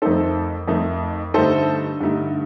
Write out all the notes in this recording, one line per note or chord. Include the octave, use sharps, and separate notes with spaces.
F2 D#3 A3 D#4 A4 C5
F2 D#3 A3 D#4
G2 D3 A3 D#4 A4 C5
G2 D3 A3 D#4